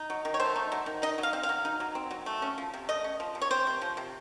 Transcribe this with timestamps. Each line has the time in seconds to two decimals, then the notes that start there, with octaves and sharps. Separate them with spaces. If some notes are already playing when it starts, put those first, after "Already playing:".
Already playing: D#4
0.10 F#3
0.25 D#3
0.34 C#5
0.40 A3 C5
0.56 D#4
0.72 F#3
0.86 D#3
1.02 D#4 D#5
1.18 F#3
1.23 F5
1.33 C4
1.43 F5
1.49 F#3
1.65 D#4
1.80 F#3
1.95 C4
2.11 F#3
2.26 A3
2.42 C#4
2.58 F3
2.74 C3
2.89 A3 D#5
3.04 C#4
3.20 F3
3.35 C3
3.42 C#5
3.51 C4 C5
3.67 C3
3.82 F3
3.97 C3